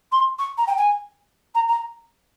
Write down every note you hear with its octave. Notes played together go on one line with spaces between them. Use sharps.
C6
C#6
A#5
G5
G#5
A#5
A#5